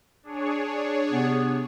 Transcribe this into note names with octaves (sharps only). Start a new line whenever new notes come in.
D4 G#4 C#5
C3 B3